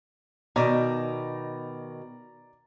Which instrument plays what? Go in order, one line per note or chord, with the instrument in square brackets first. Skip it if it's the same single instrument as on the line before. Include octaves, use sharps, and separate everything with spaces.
[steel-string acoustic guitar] B2 D#3 [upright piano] D5 A#5